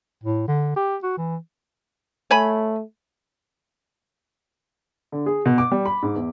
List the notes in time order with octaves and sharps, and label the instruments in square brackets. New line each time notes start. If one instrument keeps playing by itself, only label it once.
[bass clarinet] A2
D3
G4
F#4
E3
[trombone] A3 [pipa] C#5 G#5 B5
[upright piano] D3
G#4
B2
D6
G3
B5
G#2
E2